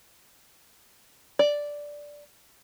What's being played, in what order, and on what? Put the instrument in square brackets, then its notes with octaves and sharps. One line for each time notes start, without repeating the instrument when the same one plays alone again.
[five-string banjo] D5